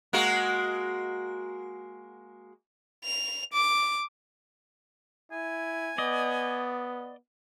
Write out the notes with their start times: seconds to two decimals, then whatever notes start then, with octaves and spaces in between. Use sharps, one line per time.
0.13 G#3 A#3 F#4
3.05 F7
3.53 D6
5.32 E4 G#5
5.98 B3 D5 D#5